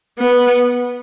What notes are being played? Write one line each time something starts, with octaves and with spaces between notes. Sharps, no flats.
B3